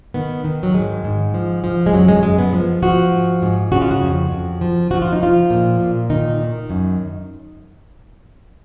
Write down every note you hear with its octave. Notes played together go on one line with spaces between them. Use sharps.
D#3 B3
D#3
F#3
G#2 G#3
G#2
F3
F3
G#3
F#2 F#3
G#3
F#2 G#3
B3
F3
F3 F#4
G#2
G#2
C#3 F#4
F4
F#4
F2
F2
F3
F3 F#4
F4
D#4
F3 F4
A#2
A#2
D#3 D#4
D#3
F#2